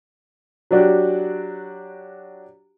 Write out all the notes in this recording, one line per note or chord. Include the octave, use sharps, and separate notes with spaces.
F#3 D4 F#4 G4